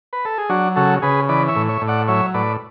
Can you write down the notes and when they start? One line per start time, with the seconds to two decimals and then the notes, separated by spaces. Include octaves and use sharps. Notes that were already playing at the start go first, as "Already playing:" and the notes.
0.13 B4
0.25 A4
0.38 G#4
0.49 F#3 D4 F#4
0.76 C#3 F#4 A4
1.02 C#3 G#4 B4
1.29 E3 B4 D5
1.48 C#5 E5
1.55 A2
1.68 C#5 E5
1.81 A2
1.88 D5 F#5
2.08 F#3 C#5 E5
2.34 A2 B4 D5